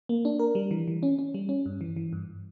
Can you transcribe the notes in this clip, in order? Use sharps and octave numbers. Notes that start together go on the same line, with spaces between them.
A#3
D4
A#4
G3
E3
E3
C#4
C#4
G3
C#4
G2
E3
E3
G2